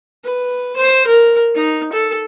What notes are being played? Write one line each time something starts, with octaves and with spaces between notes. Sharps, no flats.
B4
C5
A#4
D#4
A4